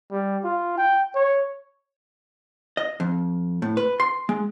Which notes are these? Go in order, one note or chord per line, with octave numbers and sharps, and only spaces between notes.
G3
F4
G5
C#5
D#5
F2
A2
B4
C6
G#3